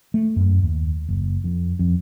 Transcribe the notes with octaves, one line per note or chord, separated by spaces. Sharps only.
A3
F#2
D#2
F#1
F2
F2